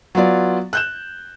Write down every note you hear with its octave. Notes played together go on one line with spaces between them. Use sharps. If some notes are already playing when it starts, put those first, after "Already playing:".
F#3 B3 F4 D5
F#6 G6 E7